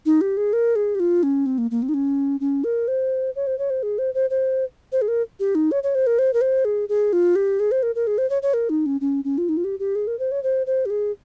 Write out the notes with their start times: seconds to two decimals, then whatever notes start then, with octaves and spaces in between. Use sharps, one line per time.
0.06 D#4
0.21 G4
0.37 G#4
0.53 A#4
0.76 G#4
0.95 G4
1.00 F4
1.23 C#4
1.46 C4
1.58 A#3
1.71 A#3
1.83 C4
1.89 D#4
1.94 C#4
2.40 C#4
2.64 A#4
2.88 C5
3.36 C#5
3.47 C5
3.59 C#5
3.70 C5
3.83 G#4
3.99 C5
4.14 C5
4.30 C5
4.92 C5
5.02 G#4
5.08 A#4
5.40 G4
5.55 D#4
5.71 C#5
5.83 C#5
5.95 C5
6.07 A#4
6.19 C5
6.33 A#4
6.41 C5
6.65 G#4
6.89 G#4
7.13 F4
7.36 G4
7.60 G#4
7.72 C5
7.83 A#4
7.95 A#4
8.07 G#4
8.18 C5
8.30 C#5
8.42 C#5
8.54 A#4
8.70 D#4
8.86 C#4
9.01 C#4
9.25 C#4
9.38 F4
9.49 D#4
9.57 F4
9.64 G4
9.79 G4
9.95 G#4
10.07 A#4
10.19 C5
10.31 C#5
10.43 C5
10.67 C5
10.86 G4
10.90 G#4